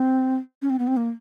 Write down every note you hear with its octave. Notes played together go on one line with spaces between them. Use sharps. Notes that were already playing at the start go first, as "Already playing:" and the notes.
Already playing: C4
C#4
C4
B3
C4
A#3